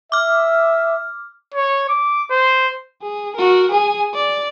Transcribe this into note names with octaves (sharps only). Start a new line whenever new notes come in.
E5 D6 F6
C#5
D6
C5
G#4
F#4 A#4
G#4 G#5
D5